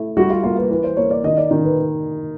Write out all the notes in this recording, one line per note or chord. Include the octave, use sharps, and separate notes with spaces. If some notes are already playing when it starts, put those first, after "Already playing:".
Already playing: A3 E4
G3 F#4
F4
A#3 F4
B4
E3 B4
C5
A#3 C#5
D5
D#3 D#5
D5
D#3
B4